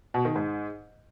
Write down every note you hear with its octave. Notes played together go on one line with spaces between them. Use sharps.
B2
D#3
G#2